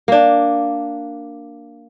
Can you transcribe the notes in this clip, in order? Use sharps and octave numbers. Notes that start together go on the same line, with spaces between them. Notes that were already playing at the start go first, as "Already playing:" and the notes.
A#3 D4